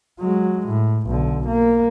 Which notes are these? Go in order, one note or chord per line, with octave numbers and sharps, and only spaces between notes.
F#3 G#3
A2
B1 D3
A#3